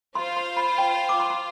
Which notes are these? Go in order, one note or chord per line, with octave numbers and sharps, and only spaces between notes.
F4 C5 F5 C6
C6
B5
G5
D6
C6
C6